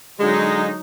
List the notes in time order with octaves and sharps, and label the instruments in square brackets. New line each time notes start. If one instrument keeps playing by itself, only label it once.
[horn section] D3 G#3 [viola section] F#3 D#4